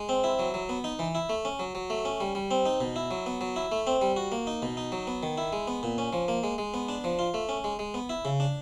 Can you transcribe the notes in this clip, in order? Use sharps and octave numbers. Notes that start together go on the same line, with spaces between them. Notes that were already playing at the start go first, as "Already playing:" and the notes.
Already playing: G#3
C4
E4
F#3
F#3
B3
D#4
E3
E4
A3
C#4
F#3
F#3
A3
C#4
G3
G3
C4
D#4
B2
E4
F#3
B3
F#3
E4
A3
C4
G3
F#4
A#3
D#4
B2
D#4
F#3
B3
D#3
E4
G#3
B3
A#2
C#4
F3
A#3
G#3
G#3
B3
D4
F3
F4
A3
C#4
G#3
G#3
B3
E4
C#3
D4